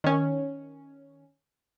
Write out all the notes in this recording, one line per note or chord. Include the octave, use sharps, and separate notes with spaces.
D#3 C#4